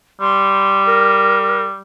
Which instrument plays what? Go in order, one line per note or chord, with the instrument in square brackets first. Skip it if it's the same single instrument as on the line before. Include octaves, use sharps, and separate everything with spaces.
[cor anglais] G3 [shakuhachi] C6
[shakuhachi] A#4